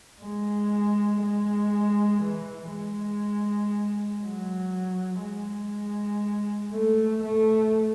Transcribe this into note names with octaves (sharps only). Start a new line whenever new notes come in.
G#3
G#3
E3
G#3
F#3
G#3
A3
A3